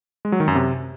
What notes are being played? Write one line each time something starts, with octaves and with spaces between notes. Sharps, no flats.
G#3
F#3
D#3
F#2
C3